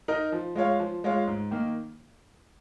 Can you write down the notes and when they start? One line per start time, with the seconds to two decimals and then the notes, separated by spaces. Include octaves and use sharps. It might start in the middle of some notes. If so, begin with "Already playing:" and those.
0.08 D#4 A#4 D#5
0.32 F3
0.55 G#3 F4 C#5 F5
0.80 F3
1.04 G#3 F4 C#5 F5
1.27 G#2
1.51 D#3 A#3